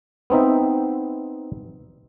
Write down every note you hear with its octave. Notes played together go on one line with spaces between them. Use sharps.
B3 C4 D#4 E5